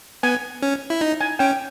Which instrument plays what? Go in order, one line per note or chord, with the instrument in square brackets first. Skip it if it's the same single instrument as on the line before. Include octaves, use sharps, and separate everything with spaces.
[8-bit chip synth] B3 [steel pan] G#5
[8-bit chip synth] C#4
E4
D#4
[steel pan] G#5
[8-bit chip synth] C#4 [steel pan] G5